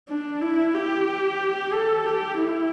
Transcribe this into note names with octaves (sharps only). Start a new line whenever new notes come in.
D4
E4
G4
A4
G4
E4